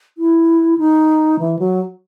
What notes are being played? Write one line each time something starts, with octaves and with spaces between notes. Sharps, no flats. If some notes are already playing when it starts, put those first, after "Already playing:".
E4
D#4
E3
F#3